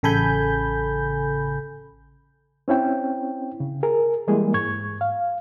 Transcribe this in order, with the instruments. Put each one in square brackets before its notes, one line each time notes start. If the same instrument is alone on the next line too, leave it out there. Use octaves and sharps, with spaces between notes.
[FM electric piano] A1 C#3 A4 G#5 B5 G6
[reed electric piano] C4 C#4 E4 G5
C#3
G#4 A#4
E3 G3 G#3 A#3 E4 G#4
G#2 C#6 G#6
F5